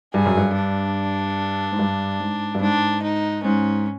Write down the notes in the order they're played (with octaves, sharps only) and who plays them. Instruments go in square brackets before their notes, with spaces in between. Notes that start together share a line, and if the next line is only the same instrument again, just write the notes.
[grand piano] G2 [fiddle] G#4
[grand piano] F#2
G2
[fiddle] D4
[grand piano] G#2
G2
G#2
G2
[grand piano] G#2 [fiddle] D4
[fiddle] D#4
[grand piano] G#2 [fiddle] C#4